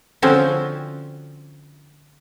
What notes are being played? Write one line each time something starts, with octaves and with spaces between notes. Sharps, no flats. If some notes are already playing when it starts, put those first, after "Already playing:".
D3 F3 C4 C#4 F#4